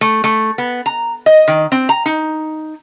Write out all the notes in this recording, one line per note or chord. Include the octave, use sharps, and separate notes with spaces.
A3
A3
B3
A#5
D#5
D#3
C4
A#5
D#4